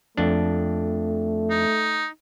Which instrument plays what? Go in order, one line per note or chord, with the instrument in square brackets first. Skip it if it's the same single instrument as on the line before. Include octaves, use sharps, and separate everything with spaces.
[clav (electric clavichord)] F2 D4 [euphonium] A3
[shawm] D#4